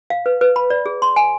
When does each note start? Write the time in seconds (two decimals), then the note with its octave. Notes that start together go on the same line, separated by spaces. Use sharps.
0.10 F5
0.26 B4
0.41 B4
0.56 B5
0.70 D5
0.86 G#4
1.02 C6
1.16 G#5